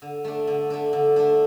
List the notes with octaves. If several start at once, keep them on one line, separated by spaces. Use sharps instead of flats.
D3
A3 D4
D3
A3 D4
D3
A3 D4